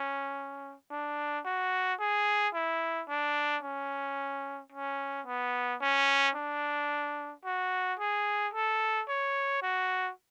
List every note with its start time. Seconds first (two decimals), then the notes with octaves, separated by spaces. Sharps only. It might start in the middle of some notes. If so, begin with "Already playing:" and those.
Already playing: C#4
0.91 D4
1.45 F#4
2.00 G#4
2.54 E4
3.08 D4
3.63 C#4
4.72 C#4
5.26 B3
5.81 C#4
6.36 D4
7.45 F#4
7.99 G#4
8.54 A4
9.08 C#5
9.62 F#4